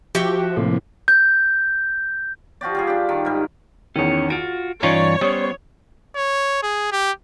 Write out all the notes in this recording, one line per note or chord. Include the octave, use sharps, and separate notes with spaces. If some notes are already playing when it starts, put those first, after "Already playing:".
F3 F#4 G4 E5 G5
A2 C3 A#3
G6
F3 F#4 G4 D5
F3 G3 G#4
D4 G4
D#3
G#2 G3
E2 D#3 C#4 C#5
F4 F#4 D7
G2 E3 C#4 D#4 F4 C#5 D5
G3 B3 C#4 C5 D#6
C#5
G#4
G4